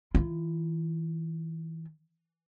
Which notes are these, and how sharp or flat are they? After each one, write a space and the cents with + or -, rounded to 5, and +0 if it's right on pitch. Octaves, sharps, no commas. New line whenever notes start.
E3 -30 F4 -45